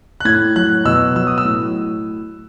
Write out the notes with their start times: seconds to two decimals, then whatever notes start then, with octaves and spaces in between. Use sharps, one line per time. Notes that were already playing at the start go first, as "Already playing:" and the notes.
0.20 F#6
0.25 A2 G#6
0.56 F#3 F#6
0.85 B2 E6
1.16 F#3 E6
1.27 D#6
1.38 E6
1.45 A2